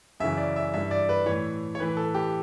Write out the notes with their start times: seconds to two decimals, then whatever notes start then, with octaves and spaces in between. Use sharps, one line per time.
0.20 F#2 C#3 E3 E5
0.38 D5
0.56 E5
0.74 G2 E3 E5
0.91 D5
1.09 B4
1.26 A2 E3 C#5
1.75 C#5
1.79 A2 E3 B4
1.97 A4
2.14 G4